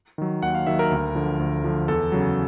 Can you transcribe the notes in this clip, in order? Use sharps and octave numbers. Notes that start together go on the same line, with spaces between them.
D#3 F#3
D#2 F#5
F5
D#3 F#3 E5
A#4
D2
D3 F3
D2
D3 F3
E2 A4
C#3 F#3